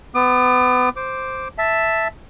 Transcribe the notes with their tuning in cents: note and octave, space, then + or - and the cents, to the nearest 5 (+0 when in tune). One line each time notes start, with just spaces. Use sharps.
B3 +30 D6 +45
C5 +0 D6 +0
E5 +0 A5 +0